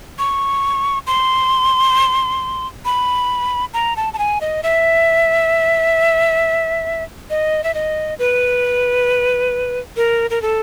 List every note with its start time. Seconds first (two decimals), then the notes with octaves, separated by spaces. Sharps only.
0.19 C#6
1.07 C6
2.85 B5
3.74 A#5
3.97 A5
4.14 A5
4.18 G#5
4.41 D#5
4.63 E5
7.30 D#5
7.64 E5
7.74 D#5
8.19 B4
9.97 A#4
10.30 A#4
10.42 A4